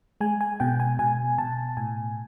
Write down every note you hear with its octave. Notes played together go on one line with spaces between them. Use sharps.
G#3 G#5
G#5
B2 G5
G#5
B2 G#5
B2 A5
A2 G#5